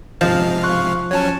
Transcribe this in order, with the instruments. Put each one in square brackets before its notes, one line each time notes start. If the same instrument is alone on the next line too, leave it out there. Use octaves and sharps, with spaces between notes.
[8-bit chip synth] G#2 C3 F5 [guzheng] F3 [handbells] D#5
[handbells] C6 C#6 F#6
[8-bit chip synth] F#3 C#4 [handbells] C#5 A5